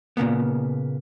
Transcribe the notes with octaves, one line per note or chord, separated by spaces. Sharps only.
A#2 C#3 A#3 B3